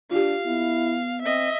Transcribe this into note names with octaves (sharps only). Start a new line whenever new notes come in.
D4 F4 G4 F5
B3 E4
C4 D#5 E5